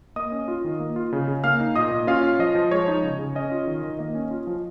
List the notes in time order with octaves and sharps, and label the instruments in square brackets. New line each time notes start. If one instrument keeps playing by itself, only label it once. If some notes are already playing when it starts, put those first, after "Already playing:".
[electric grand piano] A#3 D#5 D#6
C#4
F4
D#3
A#3
F4
C#3
C#3
A#3 F5 F6
D#4
A#2 D#5 D#6
A#2
C#4 F4 F5
F4
F3 D#5
F3
G#3 C#5
D#4
C#3
C#3
C#4 D#5
F4
D#3
D#3
A#3 D#5
C#4
F4
F3